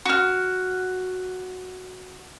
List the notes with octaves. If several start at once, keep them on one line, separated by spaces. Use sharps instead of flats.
F#4 F6